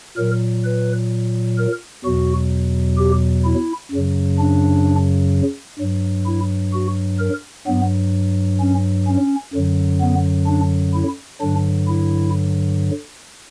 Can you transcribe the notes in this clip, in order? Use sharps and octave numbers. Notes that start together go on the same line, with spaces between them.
A#2 F#3 A#4
B4
A#4
E2 B2 F#3 F#4
G4
E4
F#2 C#3 F#3
D4
G2 F#3
E4
F#4
A#4
G2 F#3 B3
C#4
C#4
F#2 D3 F#3
B3
D4
E4
G2 D3 F#3 D4
E4